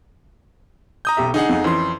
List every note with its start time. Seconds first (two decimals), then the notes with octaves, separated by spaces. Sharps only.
1.05 A#5 D#6 G6
1.17 B1 G4 E5
1.34 D3 D#4 G#4 F#5
1.49 F2
1.64 F2 E3 C#4 C6